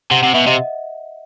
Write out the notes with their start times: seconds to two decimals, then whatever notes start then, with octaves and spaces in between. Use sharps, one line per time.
0.11 C3 F#5
0.23 C3 F#5
0.34 B2 E5
0.46 C3 D#5